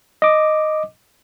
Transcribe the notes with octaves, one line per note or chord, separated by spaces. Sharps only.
D#5 D6